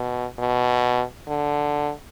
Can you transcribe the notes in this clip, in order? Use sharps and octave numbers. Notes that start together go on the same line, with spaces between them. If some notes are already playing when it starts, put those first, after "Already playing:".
Already playing: B2
B2
D3